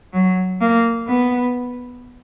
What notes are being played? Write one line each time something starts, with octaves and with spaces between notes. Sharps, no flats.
F#3
A#3
B3